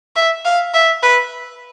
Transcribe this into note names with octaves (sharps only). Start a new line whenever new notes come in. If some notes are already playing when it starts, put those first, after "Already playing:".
E5
F5
E5
B4